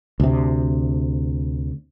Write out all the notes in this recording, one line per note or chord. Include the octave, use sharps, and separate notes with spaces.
D2 C3